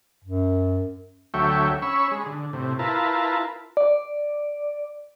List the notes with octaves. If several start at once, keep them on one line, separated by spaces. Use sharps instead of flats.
F#2
D2 F#3 A3 C#5 E5 G5
C#4 B5 C#6 E6
G#3
D3
A2 C3
E4 F4 A#4 B4 A5
D5